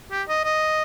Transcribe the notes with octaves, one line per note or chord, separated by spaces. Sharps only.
G4
D#5
D#5